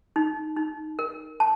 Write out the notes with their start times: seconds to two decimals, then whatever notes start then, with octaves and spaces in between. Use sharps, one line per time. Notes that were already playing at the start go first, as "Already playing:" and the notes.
0.16 D#4
0.57 D#4
0.99 A#4
1.40 A5